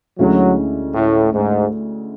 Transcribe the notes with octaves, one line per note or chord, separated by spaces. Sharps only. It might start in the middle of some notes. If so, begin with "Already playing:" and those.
D2 D3 F#3 G#3 C#4 E4
A2
G#2